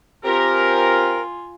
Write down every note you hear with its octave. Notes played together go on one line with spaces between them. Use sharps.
C4 F4 G4 A#4 G#5